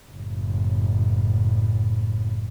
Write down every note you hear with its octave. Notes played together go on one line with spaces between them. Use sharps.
F#1 A2